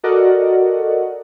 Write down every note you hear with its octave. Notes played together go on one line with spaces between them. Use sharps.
F#4 A4 A#4 D5 D#5 F#5